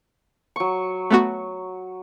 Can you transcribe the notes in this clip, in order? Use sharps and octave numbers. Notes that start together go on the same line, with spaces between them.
F#3 C#6
A3 B3 F#4